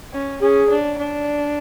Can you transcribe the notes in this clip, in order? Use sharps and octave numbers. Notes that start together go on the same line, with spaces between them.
C#4
C#4 G#4
D4
D4